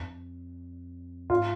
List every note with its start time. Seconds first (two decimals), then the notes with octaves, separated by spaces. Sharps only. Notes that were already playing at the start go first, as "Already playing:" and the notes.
Already playing: F2
1.30 G#2 F4